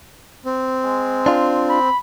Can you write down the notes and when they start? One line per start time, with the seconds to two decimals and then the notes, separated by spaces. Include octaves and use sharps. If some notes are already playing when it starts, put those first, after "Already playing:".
0.46 C4
0.84 G#3
1.26 D4 F4
1.70 B5